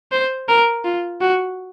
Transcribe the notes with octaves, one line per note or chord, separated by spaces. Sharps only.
C5
A#4
F4
F#4